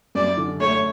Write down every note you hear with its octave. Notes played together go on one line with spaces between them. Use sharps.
F#2 D5
D3
A3 C#5